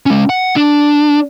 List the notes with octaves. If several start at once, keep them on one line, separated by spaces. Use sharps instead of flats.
G#3 C#4
F#5
D4